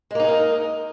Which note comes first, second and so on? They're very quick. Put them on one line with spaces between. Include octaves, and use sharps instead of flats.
G#3 A#3 D#4 G#4 A#4